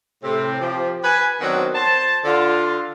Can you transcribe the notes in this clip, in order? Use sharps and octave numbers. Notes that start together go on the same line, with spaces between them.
A2 C3 C4
F3 G4
B4 G#5
D#3 F#3 B3 C4 D4 F#4
C5 A5
D3 F4